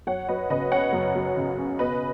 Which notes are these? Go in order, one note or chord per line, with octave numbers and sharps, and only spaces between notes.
F#2 C#5 F#5
F#3 B4 D#5
C#3 B4 D#5
C#4 C#5 F#5
F#2
F#3
C#3
C#4
B2 B4 D#5